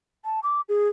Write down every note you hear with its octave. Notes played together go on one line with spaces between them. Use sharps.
A5
D6
G#4